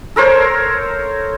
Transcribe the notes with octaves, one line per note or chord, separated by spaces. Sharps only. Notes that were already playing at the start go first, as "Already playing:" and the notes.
A4 A#4 C5 C#5